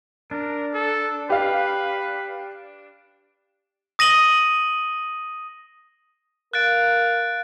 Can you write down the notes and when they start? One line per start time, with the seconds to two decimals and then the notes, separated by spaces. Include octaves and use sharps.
0.31 D4 A#4
0.74 A4
1.30 G4 B4 F5
3.99 D#6 A#6 D#7 F#7 G7
6.53 A#4 F5 F#6 A6 D7